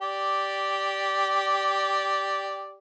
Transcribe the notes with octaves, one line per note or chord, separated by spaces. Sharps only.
G4 D5